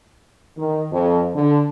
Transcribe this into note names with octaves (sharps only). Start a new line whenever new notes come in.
D#3
F2
D3